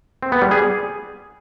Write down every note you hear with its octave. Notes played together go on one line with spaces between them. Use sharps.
C4
B3
G3
G#4